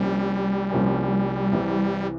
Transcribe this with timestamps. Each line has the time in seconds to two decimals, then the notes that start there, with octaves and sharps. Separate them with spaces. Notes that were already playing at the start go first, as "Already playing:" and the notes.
Already playing: C2 C3 F3 G3 A#3 C#4
0.70 C2 C3 F3 A#3 C#4
1.51 C2 C3 E3